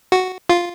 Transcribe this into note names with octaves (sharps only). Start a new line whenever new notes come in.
F#4
F4